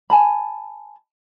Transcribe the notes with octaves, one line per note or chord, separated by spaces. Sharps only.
G#5 A5 B5